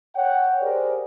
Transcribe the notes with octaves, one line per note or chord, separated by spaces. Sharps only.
C#5 F#5 G5
G4 G#4 A#4 C5 D5